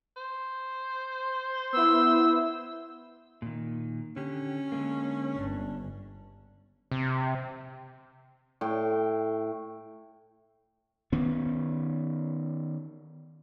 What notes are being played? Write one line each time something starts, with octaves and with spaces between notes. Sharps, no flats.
C5
B3 E4 E6
A#2 D#3
D3 C#4 G4
D3 G#3 A#3
G1 D4
C3
A2 G5
D#3 B3 C#4